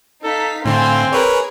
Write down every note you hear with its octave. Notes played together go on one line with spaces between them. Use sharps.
D#4 A4 F5 B6
A2 D3 C4 F5 G#5 C6
G#4 A#4 B4 C#5